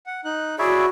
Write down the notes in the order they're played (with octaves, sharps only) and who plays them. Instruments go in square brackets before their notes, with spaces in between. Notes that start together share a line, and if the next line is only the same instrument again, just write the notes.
[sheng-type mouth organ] F#5
D#4 F#6
[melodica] E4 C#5 E5 [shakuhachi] F#4 [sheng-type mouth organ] G#4 D5